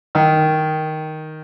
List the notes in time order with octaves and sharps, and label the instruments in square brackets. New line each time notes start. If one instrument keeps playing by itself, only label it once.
[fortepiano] D#3